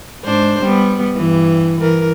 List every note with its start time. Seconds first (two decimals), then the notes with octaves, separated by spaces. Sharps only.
0.24 G#2 D4 C5
0.62 G3 B3
1.15 G2 E3
1.80 E3 A#4